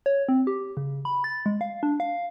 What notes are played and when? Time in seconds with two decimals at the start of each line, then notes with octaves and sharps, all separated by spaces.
0.06 C#5
0.29 C4
0.47 G4
0.77 C#3
1.05 B5
1.24 A6
1.46 G#3
1.61 F5
1.83 D4
2.00 F5